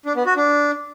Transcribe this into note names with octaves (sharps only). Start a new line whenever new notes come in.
D4
B3
F#4
D4